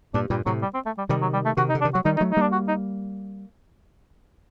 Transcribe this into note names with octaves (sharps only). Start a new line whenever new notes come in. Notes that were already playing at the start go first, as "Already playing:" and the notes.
G2 A#2 D4
G2 A#2 G3
A2 C3 F#3
G3
C4
A3
G3
C3 D#3 G3
F#3
G3
A3
C3 D#3 F#4
D#4
D3
D4
D#3
F#3 F#4
D#3 G3 D#4
D#4
F#3 A3
D#4
G3 A#3 D4
F#4
D#4